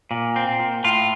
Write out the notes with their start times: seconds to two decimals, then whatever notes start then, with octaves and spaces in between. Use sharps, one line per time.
0.11 A#2
0.36 C4
0.59 A#2
0.84 A2 F4